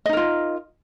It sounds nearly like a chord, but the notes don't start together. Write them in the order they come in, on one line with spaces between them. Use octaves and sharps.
D#5 D#4 A#4 F4